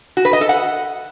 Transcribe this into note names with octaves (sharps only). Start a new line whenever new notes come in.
F#4
B4
D#5
A4
F#5